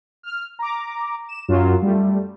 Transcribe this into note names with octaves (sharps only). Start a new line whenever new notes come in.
F6
A#5 D6
E7
F#2 F#3 F4
G3 A3